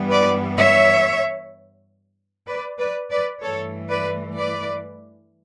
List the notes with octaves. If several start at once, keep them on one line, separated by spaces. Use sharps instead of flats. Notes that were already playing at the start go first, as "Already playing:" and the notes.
Already playing: G2 E3 G3 B3
B4 D5
C#5 E5
B4 D5
B4 D5
B4 D5
G2 E3 A3 A4 C#5
B4 D5
B4 D5